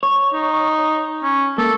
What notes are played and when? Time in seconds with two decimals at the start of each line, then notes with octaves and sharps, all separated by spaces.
0.03 C#5
0.33 D#4
1.23 C#4
1.58 A#3 A4